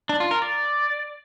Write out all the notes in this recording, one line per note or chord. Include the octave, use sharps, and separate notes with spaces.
D4
F4
A#4
D5